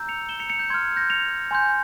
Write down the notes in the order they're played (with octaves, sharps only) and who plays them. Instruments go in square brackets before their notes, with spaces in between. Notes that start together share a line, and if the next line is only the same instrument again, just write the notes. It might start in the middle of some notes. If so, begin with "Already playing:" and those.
Already playing: [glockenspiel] A#5 E6 G6
C#7 F7
E7 G7
C#7 F7
C#7 F7
G6
C6 F6 G#6
G6 A#6
C#7 F7
G#5 C6 G6